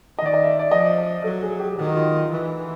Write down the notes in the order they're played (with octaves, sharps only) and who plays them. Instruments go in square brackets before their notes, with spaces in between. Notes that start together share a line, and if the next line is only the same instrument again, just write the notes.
[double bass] D#3 [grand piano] D#5
[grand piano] D5
D#5
E5
D5
[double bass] F3 [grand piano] D#5
[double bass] F#3 [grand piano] A4
[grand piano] G#4
G4
[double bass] D#3 [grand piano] F#4
[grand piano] F4
F4
[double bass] E3